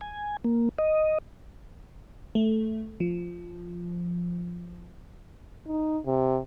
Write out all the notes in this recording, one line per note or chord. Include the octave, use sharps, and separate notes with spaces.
G#5
A#3
D#5
A3
F3
D#4
C3